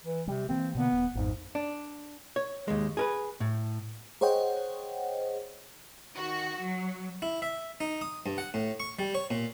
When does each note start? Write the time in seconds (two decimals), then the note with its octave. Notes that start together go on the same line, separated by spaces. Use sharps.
0.04 E3
0.28 C3 G3
0.49 E3 A#3 C4
0.75 B2 D3 A#3 B3
0.92 D#1
1.15 G#1 F2 G#2
1.55 D4
2.36 C#5
2.68 D#2 G#3
2.97 G#4 A#4 B4
3.40 A2
4.21 G#4 C5 C#5 D#5 F#5 G5
6.14 D#3 F#4
6.61 F#3
7.22 E4
7.42 E5
7.81 D#4
8.01 D#6
8.26 G2
8.38 F#5
8.54 A2
8.80 C#6
8.99 G3
9.14 C#5
9.31 A#2